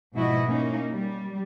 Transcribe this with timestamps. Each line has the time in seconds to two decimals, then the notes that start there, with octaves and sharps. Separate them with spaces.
0.14 G#2 B2 F3 E4 F#4 D#5
0.47 A#3 C#4 D#4
0.92 G3